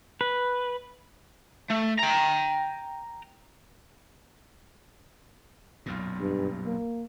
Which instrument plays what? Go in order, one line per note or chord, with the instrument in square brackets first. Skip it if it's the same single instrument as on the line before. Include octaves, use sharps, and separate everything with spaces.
[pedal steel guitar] B4
[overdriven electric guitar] A3
G5 A#5
[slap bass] B1 F#2 A#2
[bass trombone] G2
A#3